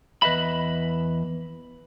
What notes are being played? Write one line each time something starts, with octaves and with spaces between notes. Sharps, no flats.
E2 B4 D#5 E5 B5